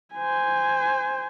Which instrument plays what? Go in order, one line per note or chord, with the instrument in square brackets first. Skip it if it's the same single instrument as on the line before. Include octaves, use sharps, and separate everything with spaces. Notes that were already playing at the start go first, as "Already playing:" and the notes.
[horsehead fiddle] C5 G#5